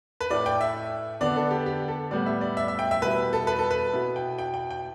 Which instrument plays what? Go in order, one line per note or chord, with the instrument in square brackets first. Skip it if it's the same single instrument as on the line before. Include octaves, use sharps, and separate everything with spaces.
[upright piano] B4
[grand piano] A2 A3 E4 [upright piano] D5
[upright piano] G5
E5
[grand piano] D3 B3 D4 [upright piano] D5
[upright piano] A4
G4
G4
A4
[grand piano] A2 G3 B3 [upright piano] D5
[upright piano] E5
D5
E5
E5
G5
E5
[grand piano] B2 G3 E4 [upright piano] B4
[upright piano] A4
B4
A4
B4
[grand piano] B2 B3 E4
[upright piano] G5
G5
G5
G5